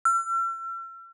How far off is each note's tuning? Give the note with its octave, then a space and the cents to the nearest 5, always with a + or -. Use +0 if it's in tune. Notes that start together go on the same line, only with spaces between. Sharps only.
E6 +45